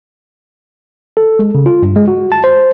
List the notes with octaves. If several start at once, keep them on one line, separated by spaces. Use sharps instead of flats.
A4
G#3
C#3
F4
G2
G#3
F#4
A5
C5